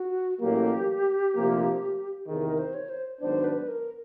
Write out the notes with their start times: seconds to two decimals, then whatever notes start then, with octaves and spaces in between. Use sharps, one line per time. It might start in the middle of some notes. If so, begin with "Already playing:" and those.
Already playing: F#4
0.40 A1 A2 F#3 A#3 G4
1.35 D2 C3 F3 A#3
2.27 E2 C3 D#3 G#4
2.43 A#4
2.59 C5
2.74 C#5
2.89 C5
3.21 G#2 D#3 F#3 B3 D4 C5
3.44 B4
3.68 A#4